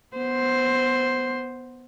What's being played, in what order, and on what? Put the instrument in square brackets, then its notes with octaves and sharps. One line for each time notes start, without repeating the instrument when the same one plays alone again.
[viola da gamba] B3 C5